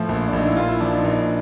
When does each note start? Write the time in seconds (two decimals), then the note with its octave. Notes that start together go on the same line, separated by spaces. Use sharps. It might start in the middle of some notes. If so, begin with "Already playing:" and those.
Already playing: A2 F3
0.09 A#1
0.28 D4
0.33 A#1 D#4
0.47 E4
0.57 A#2 F4
0.68 E4
0.81 F3 D4
0.92 D#4
1.04 A#1 D#4